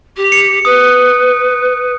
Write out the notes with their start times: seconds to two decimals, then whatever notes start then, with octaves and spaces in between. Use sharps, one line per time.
0.16 G4
0.32 C#7
0.65 B4 D#6